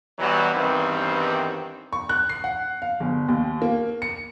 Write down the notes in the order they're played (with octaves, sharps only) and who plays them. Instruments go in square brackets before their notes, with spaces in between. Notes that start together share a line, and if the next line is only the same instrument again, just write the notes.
[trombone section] B2 E3 F#3 G3 F#4
E2 G2 D#3 E3 G3 C4
[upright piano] C#6
F#6
C7
F#5
F5
G1
D#2
A#3
C#7